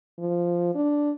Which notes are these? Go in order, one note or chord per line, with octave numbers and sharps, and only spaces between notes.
F3
D4